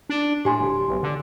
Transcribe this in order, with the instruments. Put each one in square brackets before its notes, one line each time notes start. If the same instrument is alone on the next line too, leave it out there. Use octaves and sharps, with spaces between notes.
[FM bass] D4
[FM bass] A2 [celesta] G4 G#5 C6
[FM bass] D1
B1
D3